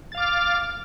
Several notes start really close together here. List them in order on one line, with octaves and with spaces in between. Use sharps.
A6 F5 D6 F6